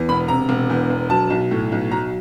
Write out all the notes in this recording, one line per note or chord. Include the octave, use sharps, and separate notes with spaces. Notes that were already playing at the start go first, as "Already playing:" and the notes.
Already playing: E2
E1 B5
C3 A#5
E1
E2
E1
F#3 A5
B1
A2
B1
F#3 A#5